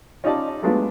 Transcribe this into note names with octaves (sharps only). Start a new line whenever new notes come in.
C#4 D#4 F4 G4 D5 A5
F#3 G#3 A3 B3 D4 F4